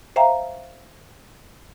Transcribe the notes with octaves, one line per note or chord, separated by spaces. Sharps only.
C5 E5 F5 G5 A#5